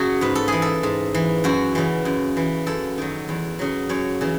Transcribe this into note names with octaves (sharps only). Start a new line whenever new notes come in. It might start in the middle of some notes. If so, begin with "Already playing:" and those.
Already playing: F#2 C#3 F#3 F#4 G#4
G#2 B4
A4
E3 G#4
A4
G#2
E3
F#2 F#4
C#3 E3
F#2
E3
F#2 A4
D#3 F#3
E2
C#3 F#3
F#2 C#5
C#3 E3